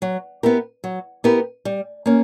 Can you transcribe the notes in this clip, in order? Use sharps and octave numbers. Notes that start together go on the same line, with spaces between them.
F#3
B3 E4 G4 A#4
F#3
B3 E4 G4 A#4
G3
A#3 C#4